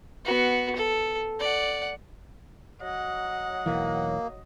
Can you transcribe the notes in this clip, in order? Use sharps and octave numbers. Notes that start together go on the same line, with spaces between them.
B3 F#4
A4
D5 F#5
F#3 D#5 F#5
E1 B1 E3 A#3